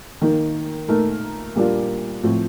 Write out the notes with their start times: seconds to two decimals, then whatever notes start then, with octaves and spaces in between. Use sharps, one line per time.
0.21 D#3 A#3 D#4
0.88 A#2 A3 D#4 A#4
1.55 A#2 G3 A#3 D4 F4
2.23 A2 F3 C4